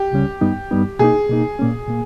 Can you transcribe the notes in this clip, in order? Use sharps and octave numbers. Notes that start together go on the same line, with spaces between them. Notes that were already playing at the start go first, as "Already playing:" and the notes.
Already playing: G4
C#2 C#3 G3 C#4
G2 G3 B3 D#4
G2 G3 B3 D#4
B2 A#3 D#4 G#4
B2 A#3 D#4
A#2 A#3 C#4
A#2 A#3